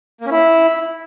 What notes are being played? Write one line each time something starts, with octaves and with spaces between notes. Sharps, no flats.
A#3
C#4
E4